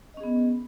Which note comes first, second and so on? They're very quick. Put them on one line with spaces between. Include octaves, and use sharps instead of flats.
D#5 C#4 G#4 B3